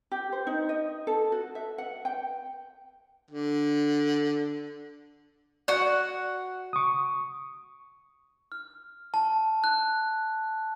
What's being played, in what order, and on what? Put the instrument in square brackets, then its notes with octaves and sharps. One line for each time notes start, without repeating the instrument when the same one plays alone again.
[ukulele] G4
C5
D#4
D#5
A4
F#4
E5
F#5
G5
[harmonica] D3
[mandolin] F#4 F#5 [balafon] D5
[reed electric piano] C#6 D#6
[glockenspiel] F6
A5
F#6